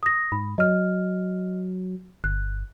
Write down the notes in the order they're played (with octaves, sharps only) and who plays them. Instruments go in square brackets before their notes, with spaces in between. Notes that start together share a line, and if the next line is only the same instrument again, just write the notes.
[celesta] D#6 A#6
[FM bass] G#2 [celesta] B5
[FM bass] F#3 [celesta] D#5 F6
[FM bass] G1 [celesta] F#6